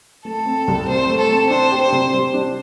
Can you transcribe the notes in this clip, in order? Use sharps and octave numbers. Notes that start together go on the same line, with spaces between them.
A3 A4
C4
C2
C3 C5
A3
A4
C4
D4 C5
G4
C5
C3
G3
D4